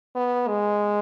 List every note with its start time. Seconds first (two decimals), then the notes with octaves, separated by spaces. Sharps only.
0.16 B3
0.48 G#3